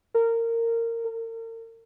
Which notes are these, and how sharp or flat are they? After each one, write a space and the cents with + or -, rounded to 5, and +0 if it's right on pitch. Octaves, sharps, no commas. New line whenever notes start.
A#4 -20
A#4 -40